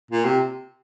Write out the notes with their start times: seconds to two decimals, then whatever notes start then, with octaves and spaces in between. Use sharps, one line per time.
0.11 A#2
0.25 C3